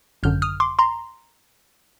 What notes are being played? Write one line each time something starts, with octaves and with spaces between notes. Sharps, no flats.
G#1 F#2 D3 F6 G6
D#6 F6
C6 D6
A#5 C6